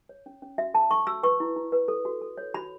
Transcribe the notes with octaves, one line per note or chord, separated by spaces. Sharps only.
C#5
C#4
C#4
F#4 E5
A4 A5
A4 C#6
F#4 E6
B4 C#6
E4
E4
B4
A4
F#4
A4
C#5
F#4 B5